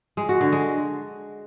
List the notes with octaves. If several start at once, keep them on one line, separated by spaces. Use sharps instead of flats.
G#3
F#4
D3
G#3